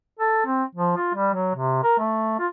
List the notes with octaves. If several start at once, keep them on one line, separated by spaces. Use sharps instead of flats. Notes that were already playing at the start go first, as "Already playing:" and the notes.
A4
C4
F3
F4
G3
F#3
C3
A#4
A3
F4